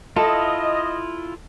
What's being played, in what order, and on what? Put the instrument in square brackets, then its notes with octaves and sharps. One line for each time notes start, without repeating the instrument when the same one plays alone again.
[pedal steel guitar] E4 F4 [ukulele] A4 [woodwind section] D#5